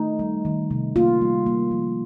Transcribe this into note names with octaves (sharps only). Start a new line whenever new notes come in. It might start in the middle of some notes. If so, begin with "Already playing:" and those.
Already playing: A3 D#4
G3
D#3
C3
A#3 F4
G3
A#3
F3